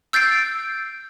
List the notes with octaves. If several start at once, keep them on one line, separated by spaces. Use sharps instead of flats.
E6 G6 A6 C7 D7